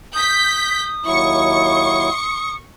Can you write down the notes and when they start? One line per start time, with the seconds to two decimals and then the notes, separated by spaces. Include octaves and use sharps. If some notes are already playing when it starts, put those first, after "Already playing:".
0.14 D#6 G6 B6
1.05 D#2 F#3 E4 C#6 C#7